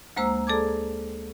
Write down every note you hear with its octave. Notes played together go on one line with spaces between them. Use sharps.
D2 G#3 A#3 C5 A#5 E6
G#4 A4 D5 A5 D6 G#6